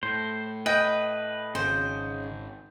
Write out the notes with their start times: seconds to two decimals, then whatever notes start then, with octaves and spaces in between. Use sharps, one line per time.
0.03 A2 C5
0.66 B4 D#5 G5
1.55 G#1 C#3 C5